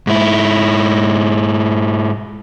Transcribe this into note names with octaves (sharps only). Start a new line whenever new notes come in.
G#2 E4